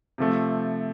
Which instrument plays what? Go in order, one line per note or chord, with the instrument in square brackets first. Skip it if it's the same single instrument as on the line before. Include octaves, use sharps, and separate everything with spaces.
[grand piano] C3 F3 A3